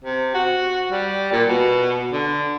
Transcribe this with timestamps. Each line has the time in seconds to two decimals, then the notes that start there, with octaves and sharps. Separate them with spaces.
0.04 C3
0.34 F#4
0.91 G3
1.32 A#2
1.48 B2
2.12 D3